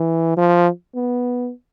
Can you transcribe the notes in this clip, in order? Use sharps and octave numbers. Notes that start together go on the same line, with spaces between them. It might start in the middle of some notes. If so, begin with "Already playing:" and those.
Already playing: E3
F3
B3